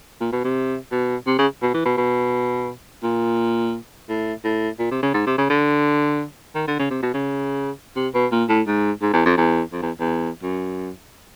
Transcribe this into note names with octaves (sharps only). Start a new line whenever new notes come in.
A#2
B2
C3
B2
C3
C#3
B2
E3
B2
B2
A#2
A2
A2
A#2
C3
C#3
G#2
C3
C#3
D3
D#3
D3
C#3
C3
B2
C#3
C3
B2
A#2
A2
G#2
G#2
E2
F2
E2
F2
E2
E2
F#2